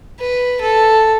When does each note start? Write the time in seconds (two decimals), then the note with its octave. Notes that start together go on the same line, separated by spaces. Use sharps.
0.20 B4
0.61 A4